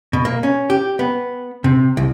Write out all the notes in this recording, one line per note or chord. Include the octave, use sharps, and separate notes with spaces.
B2
A#3
C#4
G4
B3
C3
C2